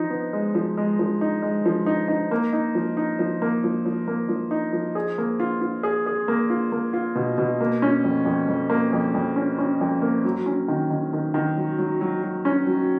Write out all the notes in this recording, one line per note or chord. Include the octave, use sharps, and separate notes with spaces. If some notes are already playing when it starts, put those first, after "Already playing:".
Already playing: F3 D#4
B3
G#3
F3
G#3
F3
D#4
G#3
F3
D#4
D#4
A#3
D#4
F3
D#4
F3
A#3
F3
F3
A#3
F3
D#4
F3
G#4
A#3
F4
F4
G#4
G#4
A#3
F4
A#3
F4
B2
B2
A#3
C#4
F2
F2
F2
A#3
F2
F2
C#4
C#4
F2
A#3
F#3
C#4
D#3
D#3
D#3
D#3
F#3
F#3
F#3
F#3
C#4
F#3